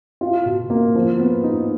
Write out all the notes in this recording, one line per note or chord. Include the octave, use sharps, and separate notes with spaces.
F4
B2
A#3
F3
B3
D#4